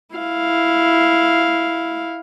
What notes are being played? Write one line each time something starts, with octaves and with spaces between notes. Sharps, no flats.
E4 F5